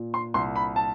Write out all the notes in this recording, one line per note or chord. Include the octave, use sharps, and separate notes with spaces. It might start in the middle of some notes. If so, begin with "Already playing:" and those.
Already playing: A#2
C6
C2 C6
B5
A5